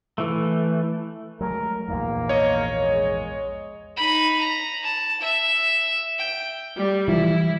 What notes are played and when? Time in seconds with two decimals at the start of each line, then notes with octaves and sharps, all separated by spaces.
0.18 E3 A3
1.41 F#3 G#3 A3 A#4
1.88 A#1 E2 G#2 A#3
2.29 C#5 D#5
2.82 G#3
3.97 D#4 B5
4.40 A#5
4.83 A5
5.21 E5
6.18 G5
6.76 G3
7.08 E3 F3 G3 E4